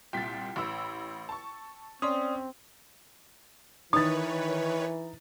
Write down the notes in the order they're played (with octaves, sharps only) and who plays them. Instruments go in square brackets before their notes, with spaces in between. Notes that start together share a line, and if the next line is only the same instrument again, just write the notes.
[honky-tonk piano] C2 A#2 B6 [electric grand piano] G5 A6
[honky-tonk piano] A1 B5 E6
A5 C#6
[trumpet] C4 [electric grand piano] C#4 [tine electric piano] D5 C6 D#6
[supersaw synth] D#3 B4 C#5 [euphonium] E3 [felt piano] D#4 A6 [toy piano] D#6